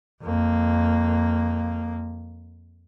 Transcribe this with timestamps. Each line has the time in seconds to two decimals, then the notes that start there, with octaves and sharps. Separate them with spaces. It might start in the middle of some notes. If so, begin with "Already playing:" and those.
0.22 F2 A#3